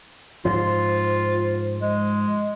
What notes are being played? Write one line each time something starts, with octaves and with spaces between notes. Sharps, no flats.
G#2 F3 F4
G#3